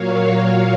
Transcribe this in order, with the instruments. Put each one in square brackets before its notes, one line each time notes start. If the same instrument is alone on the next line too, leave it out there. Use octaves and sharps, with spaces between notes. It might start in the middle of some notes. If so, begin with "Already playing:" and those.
Already playing: [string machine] A#2 F#3 A#3 C#5 F5